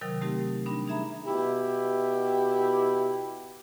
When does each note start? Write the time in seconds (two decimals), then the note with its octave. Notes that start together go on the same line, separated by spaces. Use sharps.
0.01 C3 D#3 F#3 A#4 G5 D#6
0.21 A3 C4 D#4 G4 A#4
0.66 G3 D4 D#4 B5
0.88 D#4 G#4 E5 A#5 B5
1.25 B2 E4 G4